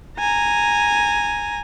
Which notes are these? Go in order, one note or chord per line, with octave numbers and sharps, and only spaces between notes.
G#5 A#5